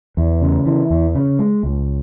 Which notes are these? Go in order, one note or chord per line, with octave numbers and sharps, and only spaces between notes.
E2
C#3
E3
E2
C#3
G#3
C#2